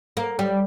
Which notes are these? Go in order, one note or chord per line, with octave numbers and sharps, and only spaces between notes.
A#3
G3